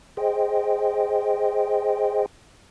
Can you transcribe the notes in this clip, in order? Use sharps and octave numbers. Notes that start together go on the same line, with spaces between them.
G#4 C5 D#5 G5